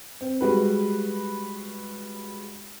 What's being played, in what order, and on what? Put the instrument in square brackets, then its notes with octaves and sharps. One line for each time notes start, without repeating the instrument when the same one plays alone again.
[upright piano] C4
G3 G#3 F#4 B4